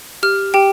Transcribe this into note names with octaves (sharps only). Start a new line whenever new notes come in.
G4 F6
G4 G5